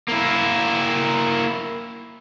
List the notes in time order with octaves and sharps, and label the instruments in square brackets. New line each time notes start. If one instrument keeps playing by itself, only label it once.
[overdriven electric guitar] A#3 E4